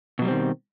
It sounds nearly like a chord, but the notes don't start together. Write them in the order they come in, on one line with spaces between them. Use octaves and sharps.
B2 F#3 G3 C4 D#3